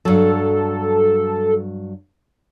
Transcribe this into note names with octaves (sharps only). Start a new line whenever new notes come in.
G2 F#3 A4